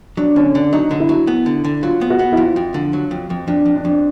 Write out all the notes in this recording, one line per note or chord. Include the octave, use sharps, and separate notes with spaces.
F#3 D4
D3 C#4
D3 D4
F#3 D#4
D3
E4
F#3
B3
D3
D3
F#3 F4
B3
F#4
B3
E4
F2 F4
F2
D3
F#3
F2
F2
F2 D4
F2
D4
F2